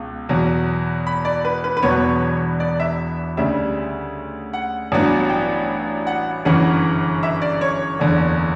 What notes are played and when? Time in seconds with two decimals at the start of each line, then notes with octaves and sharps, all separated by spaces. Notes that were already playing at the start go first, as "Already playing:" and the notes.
Already playing: C#2 B2
0.29 E2 B2 F#3
1.07 B5
1.25 D5
1.45 B4
1.64 B4
1.77 B4
1.82 E1 E2 B2 F#3 B3 C#5
2.60 D5
2.80 E5
3.37 D2 C#3 G3 E5
4.53 F#5
4.92 A1 G2 F#3 B3
5.30 G5
6.07 F#5
6.45 G1 F#2 C#3 E3 F#5
7.23 E5
7.42 D5
7.61 C#5
7.99 F#1 E2 D3